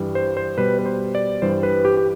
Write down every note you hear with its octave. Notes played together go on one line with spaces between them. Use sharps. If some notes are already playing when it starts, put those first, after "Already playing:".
Already playing: G2 E3 G3
C5
C5
B2 G3 B4
B4
C5
D5
G2 E3 G3 C5
B4
G4
G4